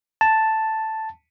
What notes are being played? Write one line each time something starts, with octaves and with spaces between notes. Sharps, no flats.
A5